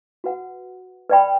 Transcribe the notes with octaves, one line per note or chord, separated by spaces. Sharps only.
F#4 B4 F#5
B4 D5 G5 B5